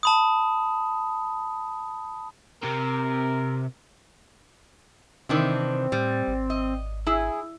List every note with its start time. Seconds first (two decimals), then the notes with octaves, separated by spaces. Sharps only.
0.03 A5 B5 D#6
2.63 C3 C4 A#4
5.29 C3 D#3 E3 C4 D4
5.92 A2 G3
6.28 G#1
6.50 D#5
7.07 E4 G#4